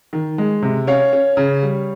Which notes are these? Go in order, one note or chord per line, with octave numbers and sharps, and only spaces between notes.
D#3
G#3
C3
C#4 C#5 F5
C#4
C#3
G3